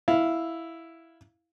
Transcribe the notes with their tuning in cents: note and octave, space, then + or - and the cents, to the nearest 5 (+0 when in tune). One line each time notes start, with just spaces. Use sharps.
E4 +0 F5 +0